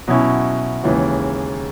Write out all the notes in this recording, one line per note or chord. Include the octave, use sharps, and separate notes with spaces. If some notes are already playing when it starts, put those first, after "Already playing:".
B2 F#3 C#4 E4
D#2 C#3 E3 G#3